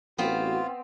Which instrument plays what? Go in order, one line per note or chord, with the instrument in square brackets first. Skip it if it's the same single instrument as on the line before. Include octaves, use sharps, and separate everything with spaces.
[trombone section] A1 F#4 [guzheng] B3 C4 [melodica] F4